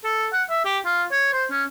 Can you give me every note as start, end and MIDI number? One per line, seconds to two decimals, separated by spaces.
0.04 0.27 69
0.33 0.44 78
0.50 0.61 76
0.65 0.79 67
0.85 1.03 65
1.12 1.30 73
1.33 1.45 72
1.51 1.64 61